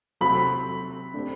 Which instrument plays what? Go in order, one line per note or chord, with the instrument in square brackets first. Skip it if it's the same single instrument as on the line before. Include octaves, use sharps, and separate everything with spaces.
[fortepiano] C3 F#3 C4 F#4 A4 [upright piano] B5
[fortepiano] D3 A3 C4 G4